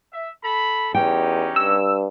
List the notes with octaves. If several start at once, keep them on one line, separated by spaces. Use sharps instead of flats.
E5
A4 B5
E2 C#4 D#4 G4 G5
G2 E6